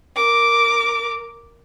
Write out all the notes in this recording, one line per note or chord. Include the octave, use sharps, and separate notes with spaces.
A#4 D6